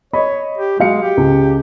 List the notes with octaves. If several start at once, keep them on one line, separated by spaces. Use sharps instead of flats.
C#5 D#5 B5
G4
F#3 G#3 F5 C#7
G4
C#2